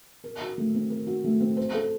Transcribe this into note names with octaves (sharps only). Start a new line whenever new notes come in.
A#4
F#4
A3
C4
A#4
F#4
A3
C4
C5
A4